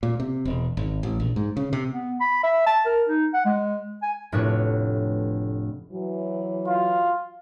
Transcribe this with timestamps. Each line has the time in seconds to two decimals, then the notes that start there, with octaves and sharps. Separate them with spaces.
0.03 A#2
0.20 C3
0.45 E1
0.77 G#1
1.03 A1
1.20 A#1
1.36 G#2
1.57 C#3
1.73 C3
1.93 B3
2.21 B5
2.43 E5
2.66 A5
2.86 A#4
3.09 D#4
3.34 F#5
3.45 G#3
4.03 G#5
4.32 F1 A2 D4 B4 C#5
5.92 E3 F#3
6.68 F4